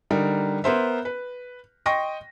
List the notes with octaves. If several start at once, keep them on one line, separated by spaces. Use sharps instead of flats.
D3 G3 D#4 A#4
B3 A#4 C5 E5
B4
D#5 G5 C6 C#6 A#6